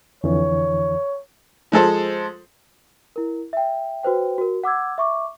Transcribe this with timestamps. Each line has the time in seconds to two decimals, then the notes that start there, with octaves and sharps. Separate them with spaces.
0.24 F2 D3 E3 C#5
1.72 F3 G#3 A4 C5
3.16 E4 A#4
3.53 E5 G5
4.03 F#4 B4 C5 G5
4.38 F#4 A#4
4.64 F#5 D6 E6 G#6
4.98 E5 C#6 D6